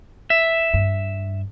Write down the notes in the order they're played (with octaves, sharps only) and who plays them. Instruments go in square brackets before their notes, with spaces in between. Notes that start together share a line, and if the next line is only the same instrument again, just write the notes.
[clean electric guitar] E5
[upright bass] G2